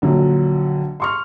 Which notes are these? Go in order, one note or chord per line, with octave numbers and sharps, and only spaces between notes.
A#1 D3 F#3
C6 C#6 F6